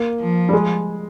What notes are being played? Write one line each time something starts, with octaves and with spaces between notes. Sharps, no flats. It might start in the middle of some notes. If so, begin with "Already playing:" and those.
Already playing: A#3
F3
G3
G#3